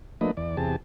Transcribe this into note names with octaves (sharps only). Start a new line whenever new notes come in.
F3 A3 A#3 D4 B4 D#5
E2 D5
E2 C3 G4 G#4 A5